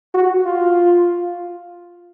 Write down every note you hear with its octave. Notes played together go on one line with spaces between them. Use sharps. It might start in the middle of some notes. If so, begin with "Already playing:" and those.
F#4
F4